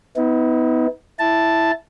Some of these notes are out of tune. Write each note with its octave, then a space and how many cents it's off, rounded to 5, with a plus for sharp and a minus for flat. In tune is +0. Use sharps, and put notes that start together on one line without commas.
B3 +15 D#4 +45
E4 +0 A5 +0